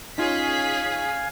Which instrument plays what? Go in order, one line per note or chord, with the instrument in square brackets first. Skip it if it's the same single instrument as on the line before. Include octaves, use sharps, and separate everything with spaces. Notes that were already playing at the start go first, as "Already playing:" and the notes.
[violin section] C#4 G#4 B6 [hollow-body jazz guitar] D#4 F4 [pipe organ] F5 G#5